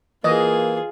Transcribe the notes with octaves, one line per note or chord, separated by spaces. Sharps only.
E3 A#3 F4 G#4 D#5